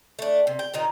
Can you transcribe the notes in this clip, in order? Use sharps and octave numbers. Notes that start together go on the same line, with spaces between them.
A3 D4
C3
G5
A#2 D#3 D#4